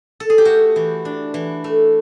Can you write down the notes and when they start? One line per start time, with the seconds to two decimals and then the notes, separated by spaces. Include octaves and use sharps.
0.20 A4
0.30 G#4
0.38 G4
0.45 A3 F#4
0.76 E3
1.05 D4
1.34 E3
1.64 A3